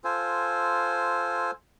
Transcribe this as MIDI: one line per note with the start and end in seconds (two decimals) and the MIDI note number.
0.04 1.51 65
0.04 1.51 69
0.04 1.51 72
0.04 1.51 80